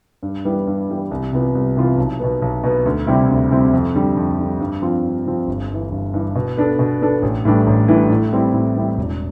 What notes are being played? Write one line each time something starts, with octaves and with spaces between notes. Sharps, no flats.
G2
E3 G3 B3 E4
G2
E3 G3 B3 E4
C2
C3 E3 B3 F4
C2
C3 E3 B3 F4
B1
B2 B3
B1
B2 B3
D2
C3 G3 C4 E4
D2
C3 G3 C4 E4
F2
D3 G3
F2
D3 G3
G2
F3 C4 F4
G2
F3 C4 F4
G1
G2 E3
G1
G2 E3
B2
B3 D4 A4
B2
B3 D4 A4
A1
A2 E3 G3 D4
A1
A2 E3 G3 D4
A2
E3 G3 C4 E4
A2
E3 G3 C4 E4
E1